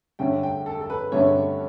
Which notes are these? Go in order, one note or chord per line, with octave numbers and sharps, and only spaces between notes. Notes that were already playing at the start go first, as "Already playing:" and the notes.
G2 D3 A3 C#4 G5
G5
A4
A4
B4
G2 D3 A3 C#4 C#5